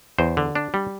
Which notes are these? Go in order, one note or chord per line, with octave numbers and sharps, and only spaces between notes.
E2 C5
D3
D4
G3